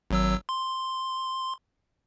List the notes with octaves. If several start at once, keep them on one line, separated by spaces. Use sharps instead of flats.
G#1 F#3 E6
C6